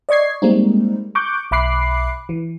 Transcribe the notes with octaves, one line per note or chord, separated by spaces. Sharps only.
D5 D#5 C#6 G#6 C7
G3 G#3 A#3 C4 D#4
C#6 D6 F#6 G6
B1 E5 B5 D6 F#6 C7
E3